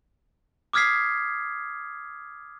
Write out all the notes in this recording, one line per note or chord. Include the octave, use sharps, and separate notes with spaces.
D6 D#6 F6 G#6 B6 C7